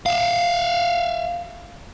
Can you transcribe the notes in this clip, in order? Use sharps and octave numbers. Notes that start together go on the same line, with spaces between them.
E5 F5